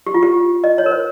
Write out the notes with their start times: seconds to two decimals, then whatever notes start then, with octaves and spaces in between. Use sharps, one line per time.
0.07 G4
0.14 F4
0.23 G4
0.64 D#5
0.78 C#5
0.86 A#4
0.91 C5